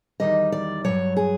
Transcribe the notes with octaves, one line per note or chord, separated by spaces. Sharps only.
E2 C3 D#3 G3 D#5
D5
G2 D#3 F#3 C#5
G#4